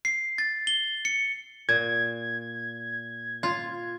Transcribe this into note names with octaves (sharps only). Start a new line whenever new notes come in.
C7
A6
G7
C#7
A#2 G#6
F4